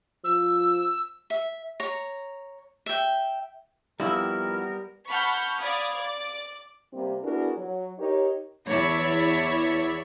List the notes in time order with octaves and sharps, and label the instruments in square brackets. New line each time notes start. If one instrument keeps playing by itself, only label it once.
[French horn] F3 [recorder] E6
[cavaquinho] E5
C#5 A#5
E5 G5
[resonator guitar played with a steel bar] F2 E4 [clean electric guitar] G3 [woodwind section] B3 A#4
[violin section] F#5 A5 B5 C#6 F6 G6
D5 F5 B5 D#6 G#6
D5 D6
[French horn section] C3 G3 A#3 C4
B3 D4 E4 F#4 G#4 A#4
F#3
D#4 G4 A#4 C#5
[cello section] E2 E4 C#5 D5 E5